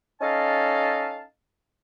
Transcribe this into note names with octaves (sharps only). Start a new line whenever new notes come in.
C#4 D#4 A4 D#5 F5 A5